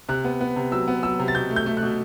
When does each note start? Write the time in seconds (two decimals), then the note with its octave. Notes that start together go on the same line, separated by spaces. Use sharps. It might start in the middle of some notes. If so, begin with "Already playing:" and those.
0.09 C3 F#6
0.25 B3
0.41 B3
0.56 C3
0.72 F#3 E6
0.88 B3
1.03 F#3 E6
1.19 C3
1.28 A6
1.35 B2 G6
1.51 A3
1.56 G6
1.66 A3
1.77 F#6
1.83 B2